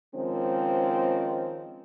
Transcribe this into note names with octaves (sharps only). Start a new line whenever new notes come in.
D#3 F3 G#3 C4 C#4